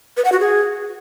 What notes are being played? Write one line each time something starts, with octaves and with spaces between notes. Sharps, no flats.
B4
F#5
F#4
G#4